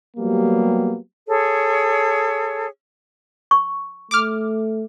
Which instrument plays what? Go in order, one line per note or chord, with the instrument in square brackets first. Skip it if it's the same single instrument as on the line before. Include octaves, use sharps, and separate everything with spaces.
[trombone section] F#3 G3 A#3 B3 G4
[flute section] G#4 A4 C#5
[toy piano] C#6
[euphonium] A3 [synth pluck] D6 F6